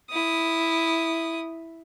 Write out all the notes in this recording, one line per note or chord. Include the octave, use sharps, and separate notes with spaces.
E4 D#6